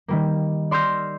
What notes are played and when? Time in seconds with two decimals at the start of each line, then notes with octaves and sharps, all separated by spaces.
0.08 D#3 G3 A#3
0.71 D5 C6 E6 F6 G6 A#6